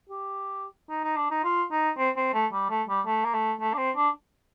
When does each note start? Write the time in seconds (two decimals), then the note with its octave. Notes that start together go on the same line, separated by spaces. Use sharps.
0.09 G4
0.90 D#4
1.04 D#4
1.17 D4
1.31 D#4
1.44 F4
1.71 D#4
1.98 C4
2.17 C4
2.34 A3
2.53 G3
2.70 A3
2.88 G3
3.06 A3
3.24 A#3
3.34 A3
3.60 A3
3.74 D4
3.78 C4
3.96 D4